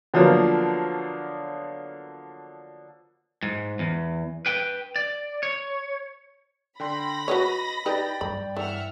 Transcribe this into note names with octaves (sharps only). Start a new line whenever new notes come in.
D3 F3 F#3 A#3 B3
G#2
E2
B4 G5
D5
C#5
D3 G5 B5 C6 A#6
F#4 B4 C#5 D#5
D#4 G4 B4 D5 G5 A6
G2 B5
E3 E5 F#5 F6